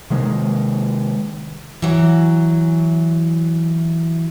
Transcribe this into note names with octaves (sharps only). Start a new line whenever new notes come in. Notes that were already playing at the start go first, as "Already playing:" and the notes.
C3 D#3 G#3
E3 F#3